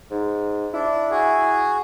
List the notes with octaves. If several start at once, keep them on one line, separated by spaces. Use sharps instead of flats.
G#2
D4 E4
F#4 G#4